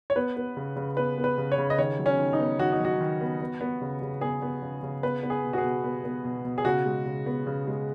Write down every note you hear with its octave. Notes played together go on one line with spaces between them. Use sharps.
C#5
B3 B4
B3
C#3
C#3
B3 B4
B3
B4
C#3
C#5
C#3
D#5
D#3 C#5
F#3
C#4
D#3
D#4
B3
D#3 F#4
D#4
F#3
F#4
D#3
B3
B3
B3
C#3
C#3
B3 G#4
B3
C#3
C#3
B3 B4
B3
G#4
B2
F#4
G#4
B2
B3
B3
B2
B2
G#4
C#3 F#4
G#3
C#3
B3
C#3
G#3